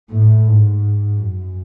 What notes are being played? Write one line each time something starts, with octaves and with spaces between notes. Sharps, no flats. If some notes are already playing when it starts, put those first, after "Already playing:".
A2
G#2
F#2